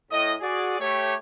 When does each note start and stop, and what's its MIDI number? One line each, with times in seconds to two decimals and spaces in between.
0.12 0.35 45
0.12 0.35 75
0.41 0.77 66
0.41 0.77 68
0.41 0.77 74
0.80 1.14 57
0.80 1.14 67
0.80 1.14 73